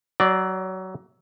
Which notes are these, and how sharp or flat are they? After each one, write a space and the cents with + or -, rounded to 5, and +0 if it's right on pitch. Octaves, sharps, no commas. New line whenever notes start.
F#3 +20 D5 +0